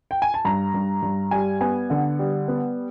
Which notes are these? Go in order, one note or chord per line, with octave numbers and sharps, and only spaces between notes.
G5
G#5
A5
G2 A#5
G2
G2
G3 G#5
B3 G#5
D3 F#5
G3
B3